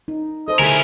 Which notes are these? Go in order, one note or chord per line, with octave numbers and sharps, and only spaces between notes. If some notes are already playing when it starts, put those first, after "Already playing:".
D#4
A4 C5 D#5
D3 A3 E4 G#4 A#4 G#5